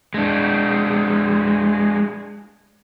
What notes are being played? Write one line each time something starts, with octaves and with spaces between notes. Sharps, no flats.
G#3 D4